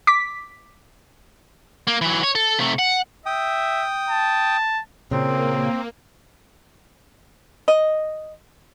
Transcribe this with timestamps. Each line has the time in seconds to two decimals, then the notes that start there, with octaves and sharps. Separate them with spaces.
0.07 D6 B6
1.87 A#3
2.01 E3 F#3
2.23 C#5
2.35 A4
2.59 C3 A3
2.79 F#5
3.26 E5 G5 D#6
4.09 A5
5.11 A#2 C#3 A#3 C4
7.68 D#5